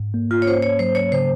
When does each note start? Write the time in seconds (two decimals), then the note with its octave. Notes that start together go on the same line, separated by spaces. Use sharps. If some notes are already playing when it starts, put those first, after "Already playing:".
Already playing: G#2
0.14 A#3
0.31 F4
0.42 C#5
0.46 C#4 C5
0.62 C#5
0.79 F#3 C5
0.95 C#5
1.12 C#3 C5